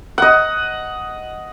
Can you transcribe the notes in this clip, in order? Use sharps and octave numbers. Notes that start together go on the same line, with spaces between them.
D#5 F#5